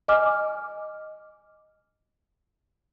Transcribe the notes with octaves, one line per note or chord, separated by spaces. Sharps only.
D#5 G#5 D6 F6